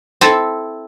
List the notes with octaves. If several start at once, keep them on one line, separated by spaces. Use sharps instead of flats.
C4 E4 A4